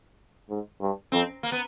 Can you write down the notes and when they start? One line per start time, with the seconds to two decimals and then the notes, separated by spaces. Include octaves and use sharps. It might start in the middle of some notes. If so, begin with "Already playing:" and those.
0.50 G#2
0.81 G2
1.12 F2 C4
1.43 A#3
1.52 B3